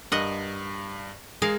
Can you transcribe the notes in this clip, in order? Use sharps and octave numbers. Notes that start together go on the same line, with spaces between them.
G2 A#4 D#5 F#5
G#3 G#4 A#4 F5